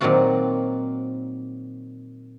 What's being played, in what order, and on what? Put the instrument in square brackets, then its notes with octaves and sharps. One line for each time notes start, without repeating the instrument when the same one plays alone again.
[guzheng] A#2 D#3 F#3 C4 F4 F#4